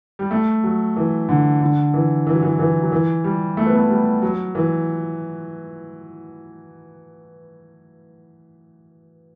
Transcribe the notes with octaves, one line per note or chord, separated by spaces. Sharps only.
G3
A3
F#3
E3
D3
D3
E3
E3
F#3
E3
E3
F#3
E3
G3
A3
B3
A3
G3
F#3
E3